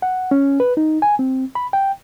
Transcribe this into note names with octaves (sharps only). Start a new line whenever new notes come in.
F#5
C#4
B4
D#4
G#5
C4
B5
G5